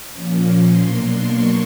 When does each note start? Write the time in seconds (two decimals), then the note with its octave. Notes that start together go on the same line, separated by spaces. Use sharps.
0.11 A#2 F3 A#3 C#4 A#5
0.46 C6
0.79 B2 F#3 A#3 D4 C6
1.13 C#6